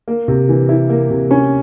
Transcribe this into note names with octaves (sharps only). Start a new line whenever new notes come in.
A#3
C3
E3
E4
A#3
C3
C#4